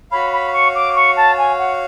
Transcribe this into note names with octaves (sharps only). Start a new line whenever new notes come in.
F#4 C#5 F5 B5
B5
C#6
D6
C#6
A5
G#5
F#5